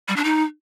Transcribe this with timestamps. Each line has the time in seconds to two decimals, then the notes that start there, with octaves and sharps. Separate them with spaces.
0.08 G3
0.16 D4
0.24 D#4